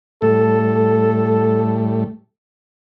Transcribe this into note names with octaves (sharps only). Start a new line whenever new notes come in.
A2 G3 A3 A4